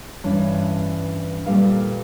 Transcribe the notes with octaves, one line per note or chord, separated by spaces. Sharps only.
G2 E3 C#4 D4
A#2 G3 A4 B4 F5